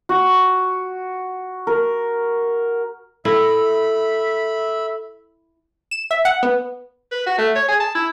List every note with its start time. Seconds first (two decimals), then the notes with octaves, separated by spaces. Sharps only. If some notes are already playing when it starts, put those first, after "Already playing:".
0.09 F#4
1.67 A#4
3.25 E4 A4 E5 B5
5.91 E7
6.11 E5
6.25 F#5
6.43 B3
7.12 B4
7.26 F#4
7.38 A3
7.56 C#5
7.68 G#4
7.80 A5
7.95 E4